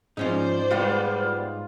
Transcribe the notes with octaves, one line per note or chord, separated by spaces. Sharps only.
G#2 F3 C#4 D#4 C5 D5
G3 G#3 B3 F4